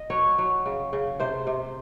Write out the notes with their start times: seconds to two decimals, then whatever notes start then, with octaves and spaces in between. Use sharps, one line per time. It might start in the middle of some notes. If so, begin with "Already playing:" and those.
Already playing: D#5
0.10 F#3 C#5
0.38 F#3
0.66 C#3
0.93 C#3
1.20 C3 C5
1.47 C3